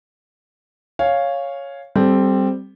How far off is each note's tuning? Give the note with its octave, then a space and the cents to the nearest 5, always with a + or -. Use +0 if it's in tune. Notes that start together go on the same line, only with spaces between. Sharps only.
C#5 +0 F5 +0 G#5 -5
G3 +0 C4 +0 A4 -25